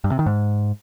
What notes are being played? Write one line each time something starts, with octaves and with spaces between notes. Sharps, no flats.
G2
C3
D#3
G#2